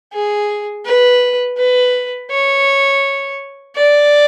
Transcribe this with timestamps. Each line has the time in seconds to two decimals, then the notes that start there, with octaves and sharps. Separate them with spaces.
0.13 G#4
0.85 B4
1.58 B4
2.31 C#5
3.76 D5